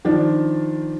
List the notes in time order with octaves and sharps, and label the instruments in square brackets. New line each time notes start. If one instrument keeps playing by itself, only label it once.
[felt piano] D#3 F3 D4